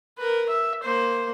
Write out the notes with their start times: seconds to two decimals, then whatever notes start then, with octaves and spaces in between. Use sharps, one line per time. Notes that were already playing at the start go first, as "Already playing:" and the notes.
0.18 A#4 B4
0.49 E5
0.83 A#3 C5